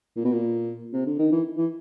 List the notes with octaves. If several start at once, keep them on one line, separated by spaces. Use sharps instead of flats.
A#2
B2
A#2
C3
D3
D#3
E3
E3